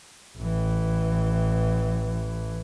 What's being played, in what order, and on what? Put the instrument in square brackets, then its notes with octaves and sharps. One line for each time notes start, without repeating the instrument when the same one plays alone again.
[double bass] A1 E3